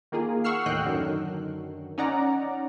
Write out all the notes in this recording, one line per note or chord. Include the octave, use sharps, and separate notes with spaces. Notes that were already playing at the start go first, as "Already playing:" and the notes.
D#3 A#3 F4 G#4
F#5 C#6 E6 F6 C7
D#2 A2 D#3 D#5 G5 F#6
F#2 D3 D#3 F#3
C#4 D#4 D5 F#5 A#5